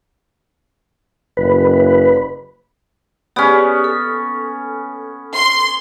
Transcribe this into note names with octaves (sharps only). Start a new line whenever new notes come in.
F#1 B4
B3 C#4 G4 G#4 D5
A4
C6